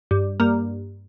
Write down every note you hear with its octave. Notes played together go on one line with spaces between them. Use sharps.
G2
G2 A#3